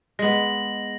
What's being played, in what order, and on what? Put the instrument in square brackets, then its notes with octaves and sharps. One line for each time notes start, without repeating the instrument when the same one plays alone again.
[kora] G#3 B3 [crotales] A#6 F#7